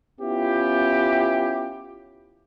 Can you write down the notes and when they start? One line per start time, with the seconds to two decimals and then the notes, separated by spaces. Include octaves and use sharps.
0.21 B3 C#4 E4 F4 G4